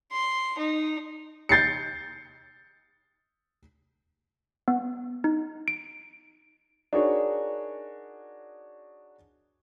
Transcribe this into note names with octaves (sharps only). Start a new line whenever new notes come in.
C6
D#4
G6 A6 C7 C#7
B3
D#4
D7
D4 D#4 F#4 G#4 A#4 C#5